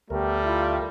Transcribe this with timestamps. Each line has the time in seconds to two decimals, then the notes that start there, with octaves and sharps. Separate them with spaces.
0.10 D2 G3 A3 B3 G4 A#4
0.45 E4 F4